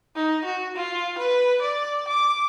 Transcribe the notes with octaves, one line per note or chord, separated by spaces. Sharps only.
D#4
F#4
F4
B4
D5
D6